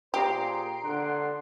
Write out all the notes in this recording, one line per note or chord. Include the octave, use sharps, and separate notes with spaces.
A#2 G4 G#4 C5 A#5 C6 C7 D7
D3 F#5 C6